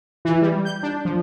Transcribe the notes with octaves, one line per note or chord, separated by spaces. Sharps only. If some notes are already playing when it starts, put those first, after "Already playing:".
E3
G3
G6
D4
F3